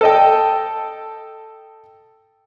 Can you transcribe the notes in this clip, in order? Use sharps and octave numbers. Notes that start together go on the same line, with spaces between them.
A4 D#5 G5